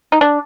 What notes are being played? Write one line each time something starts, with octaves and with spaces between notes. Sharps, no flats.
D#4
D4